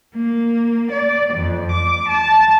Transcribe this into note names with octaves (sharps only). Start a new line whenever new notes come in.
A#3
D5
F2
D6
A5